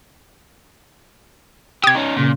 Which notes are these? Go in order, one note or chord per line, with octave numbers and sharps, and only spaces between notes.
C3 G4 D#6 G#6
C#4 D#4
A#2 C#3